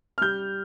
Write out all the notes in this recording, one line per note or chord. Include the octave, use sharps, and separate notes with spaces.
F6
G3 G6